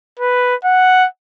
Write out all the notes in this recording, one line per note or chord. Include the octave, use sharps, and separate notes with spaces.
B4
F#5